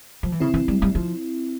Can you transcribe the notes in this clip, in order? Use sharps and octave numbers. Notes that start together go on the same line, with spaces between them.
F3
E3
C#3 C4 E4
E3
G3
G3
F3